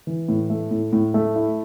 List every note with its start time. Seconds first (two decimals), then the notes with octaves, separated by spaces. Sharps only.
0.07 E3
0.28 A2
0.50 A3
0.71 A2
0.93 A2
1.14 A3
1.36 E4